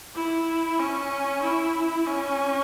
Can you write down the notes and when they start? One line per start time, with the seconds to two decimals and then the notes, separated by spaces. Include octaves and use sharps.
0.15 E4
0.80 C#4
1.42 E4
2.07 C#4